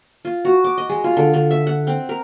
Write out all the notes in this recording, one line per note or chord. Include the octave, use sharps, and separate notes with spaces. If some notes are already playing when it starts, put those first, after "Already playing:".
F4
F#4
D6
D#5
G#3
F4
D3
D3
E5
F#5
C4
A#4